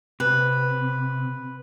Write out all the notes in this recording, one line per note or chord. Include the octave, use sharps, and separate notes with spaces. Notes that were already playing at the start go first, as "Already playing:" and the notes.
C3 B4